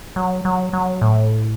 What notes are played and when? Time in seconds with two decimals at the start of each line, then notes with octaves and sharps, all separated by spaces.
0.16 F#3
0.45 F#3
0.73 F#3
1.01 A2